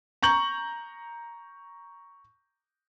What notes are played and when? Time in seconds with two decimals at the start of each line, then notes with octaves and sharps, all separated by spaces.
0.23 A#5 C#6 G6 F#7